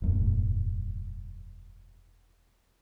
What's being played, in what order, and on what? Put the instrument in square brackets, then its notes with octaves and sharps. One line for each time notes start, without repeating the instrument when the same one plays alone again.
[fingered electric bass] E1 F#2 A2